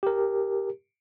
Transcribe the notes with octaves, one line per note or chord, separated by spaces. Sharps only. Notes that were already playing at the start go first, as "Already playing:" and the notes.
G4 A#4